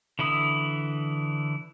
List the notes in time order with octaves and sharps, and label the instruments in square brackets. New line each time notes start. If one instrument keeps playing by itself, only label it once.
[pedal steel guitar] D3 E3 E4 B5 D#6